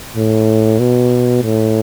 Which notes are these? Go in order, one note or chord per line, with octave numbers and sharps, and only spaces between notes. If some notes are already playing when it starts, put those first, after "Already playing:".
A2
B2
A2